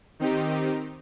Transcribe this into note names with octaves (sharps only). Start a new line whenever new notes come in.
D#3 C4 D#4 G4